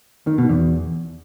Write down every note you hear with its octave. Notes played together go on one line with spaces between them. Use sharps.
D#3
B2
E2